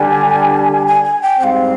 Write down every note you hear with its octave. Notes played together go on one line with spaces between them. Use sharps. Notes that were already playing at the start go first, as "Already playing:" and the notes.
Already playing: D3 G3 D4 G4 G#5
G#5
G#5
G5
G#2 G3 C4 F5 G5